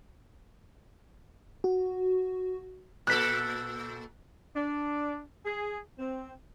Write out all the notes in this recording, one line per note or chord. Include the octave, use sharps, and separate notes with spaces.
F#4
A#2 A4 F#6 B6
D4
G#4
C4